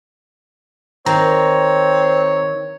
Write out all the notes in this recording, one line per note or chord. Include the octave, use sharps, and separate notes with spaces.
D#3 C4 C#5 A#5